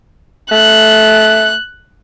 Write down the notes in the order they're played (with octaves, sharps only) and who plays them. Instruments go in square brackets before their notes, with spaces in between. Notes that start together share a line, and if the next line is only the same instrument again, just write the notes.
[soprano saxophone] A3 [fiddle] F#6